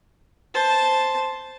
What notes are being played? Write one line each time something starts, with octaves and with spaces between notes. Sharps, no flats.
C5 A5